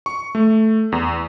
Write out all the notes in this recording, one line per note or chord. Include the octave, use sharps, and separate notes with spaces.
C#6
A3
E2